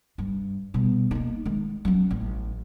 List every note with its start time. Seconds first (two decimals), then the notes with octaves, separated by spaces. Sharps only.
0.18 G2
0.74 B2 G3
1.11 A#3 D#4
1.45 D#3 G#3
1.85 F#3 C#4
2.11 A1